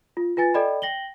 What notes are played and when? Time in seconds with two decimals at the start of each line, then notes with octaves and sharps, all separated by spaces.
0.17 F4
0.37 F4 B4 G#5 A6
0.54 A4 D5 D#5 G5 B5
0.82 G5 A#6 F#7 G7